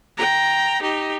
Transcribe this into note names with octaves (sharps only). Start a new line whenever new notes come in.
G5 A#5
D#4 G4